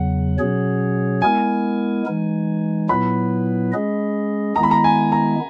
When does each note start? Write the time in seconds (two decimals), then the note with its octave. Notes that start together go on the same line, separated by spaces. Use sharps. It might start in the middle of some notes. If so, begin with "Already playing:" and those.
Already playing: E2 C#3 F#3 F#5
0.38 B2 F#3 C#4 G#4 C#5
1.22 G#3 B3 E4 A#4 G#5
2.06 E3 G#3 D#4
2.89 A#2 F#3 B3 E4 B4 B5
3.72 G#3 C#4 G#4 D#5
4.56 D#3 G#3 B3 E4 A#5
4.63 B5
4.71 A#5
4.84 G#5
5.12 A#5